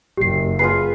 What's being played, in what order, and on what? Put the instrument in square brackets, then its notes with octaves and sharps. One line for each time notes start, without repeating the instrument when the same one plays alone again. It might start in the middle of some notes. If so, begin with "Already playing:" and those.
[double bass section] F#1 [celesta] G4 C7
[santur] F4 G#4 B4 [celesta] C7